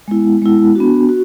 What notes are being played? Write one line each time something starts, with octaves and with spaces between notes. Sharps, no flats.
G#3 B3 E4
G#3 B3 E4
B3 D4 F#4
F#4